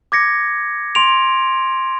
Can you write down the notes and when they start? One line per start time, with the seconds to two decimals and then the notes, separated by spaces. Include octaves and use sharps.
0.12 D6 G#6 A#6 C#7
0.95 C6 D7 F7